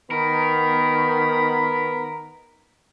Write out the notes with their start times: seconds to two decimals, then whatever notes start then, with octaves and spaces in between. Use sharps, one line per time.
0.11 D#3 B3 A#4 B5